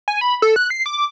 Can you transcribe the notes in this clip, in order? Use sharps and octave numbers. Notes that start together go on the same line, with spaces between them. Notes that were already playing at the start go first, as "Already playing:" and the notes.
G#5
B5
A4
F#6
C7
D6